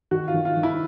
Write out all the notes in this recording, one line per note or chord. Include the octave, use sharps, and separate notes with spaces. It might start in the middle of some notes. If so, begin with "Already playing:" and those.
D#3 F#4
F4
D#3
F4
D#3
E4